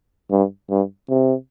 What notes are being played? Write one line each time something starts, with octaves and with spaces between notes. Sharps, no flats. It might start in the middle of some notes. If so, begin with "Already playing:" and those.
G2
G2
C3